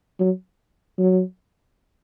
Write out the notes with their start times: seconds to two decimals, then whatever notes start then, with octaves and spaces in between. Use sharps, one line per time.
0.20 F#3
0.98 F#3